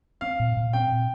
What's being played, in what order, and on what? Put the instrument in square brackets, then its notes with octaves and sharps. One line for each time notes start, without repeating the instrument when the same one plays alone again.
[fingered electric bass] C4 [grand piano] F5
[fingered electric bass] A#2
A#2
[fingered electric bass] C4 [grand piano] G5
[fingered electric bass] A#2